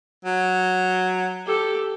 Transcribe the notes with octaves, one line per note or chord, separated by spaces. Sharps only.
F#3
G4 A4